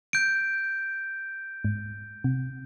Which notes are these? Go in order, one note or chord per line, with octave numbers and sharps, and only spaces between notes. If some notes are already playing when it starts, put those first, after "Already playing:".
G6 D7
G#2
C3